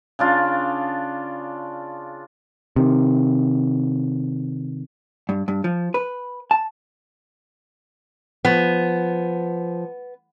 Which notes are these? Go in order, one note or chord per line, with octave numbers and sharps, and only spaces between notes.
C#3 D4 F4
C3 D#3
G2
G2
F3
B4
A5
F3 B3